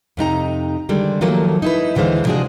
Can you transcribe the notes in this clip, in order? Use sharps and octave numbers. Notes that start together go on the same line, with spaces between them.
F2 C3 D#4 A#5
D3 D#3 G3 G#3
D#3 F3 F#3 A3 A#3
D#4 E4 B4
D#2 D3 E3 G#3 C5 F5
C3 F3 G#3 D4 F#4 G#4